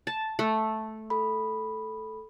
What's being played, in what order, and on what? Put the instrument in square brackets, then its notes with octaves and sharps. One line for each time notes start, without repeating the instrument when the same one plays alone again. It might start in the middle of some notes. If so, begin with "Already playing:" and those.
[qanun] A5
A3
[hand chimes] A4 B5